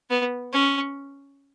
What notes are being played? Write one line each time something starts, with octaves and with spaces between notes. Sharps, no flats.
B3
C#4